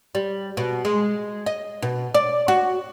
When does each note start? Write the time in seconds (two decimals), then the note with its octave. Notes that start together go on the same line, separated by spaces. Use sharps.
0.15 G3
0.57 B2
0.85 G#3
1.46 D#5
1.82 B2
2.15 D5
2.48 F#4